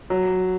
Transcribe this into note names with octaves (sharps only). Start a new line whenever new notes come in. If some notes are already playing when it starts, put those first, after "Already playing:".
F#3